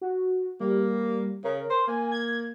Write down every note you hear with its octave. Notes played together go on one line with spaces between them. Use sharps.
F#4
G3 A#3
C#3 A#4
C5
A#3 G#5
G#6